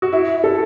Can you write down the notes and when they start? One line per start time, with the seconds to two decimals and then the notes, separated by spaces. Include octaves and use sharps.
0.02 F#4
0.13 E4
0.44 A4